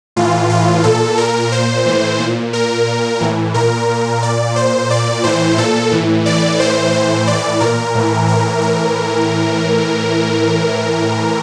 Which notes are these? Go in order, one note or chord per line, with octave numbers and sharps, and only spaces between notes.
A2 E3 F4
A2 E3 F4
A#2 A4
A#2 A#4
A#2 C5
A2 E3
A#2
A#2 A#4
A#2
A2 E3
A#2 A#4
A#2
A#2 D5
A#2 C5
A#2 D5
A2 E3 C5
A#2 A4
A2 E3
A2 E3 D5
A2 E3 C5
A2 E3 C5
A2 E3 D5
A#2 A#4
A2 E3
A2 E3 A#4
A2 E3 A#4